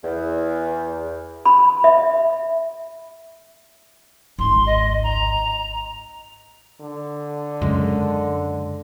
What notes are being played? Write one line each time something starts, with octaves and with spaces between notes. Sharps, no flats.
E2
B5
E5
G#1 C#2 C6
D#5
A#5
D3
F#2 C#3 G#3